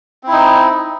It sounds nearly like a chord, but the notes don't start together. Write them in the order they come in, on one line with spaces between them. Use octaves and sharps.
C4 E4 D#4